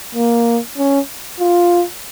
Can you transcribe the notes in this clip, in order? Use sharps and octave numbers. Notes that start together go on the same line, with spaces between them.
A#3
C#4
F4